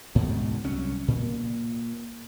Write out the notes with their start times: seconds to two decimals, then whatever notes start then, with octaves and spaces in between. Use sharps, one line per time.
0.15 D2 G#2 B2
0.64 C2 F#3 C#4
1.08 A#2